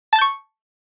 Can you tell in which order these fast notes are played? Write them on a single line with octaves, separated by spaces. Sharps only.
A5 A6 G6 C#6